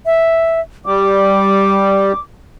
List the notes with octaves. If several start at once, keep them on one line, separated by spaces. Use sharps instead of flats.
E5
G3 D6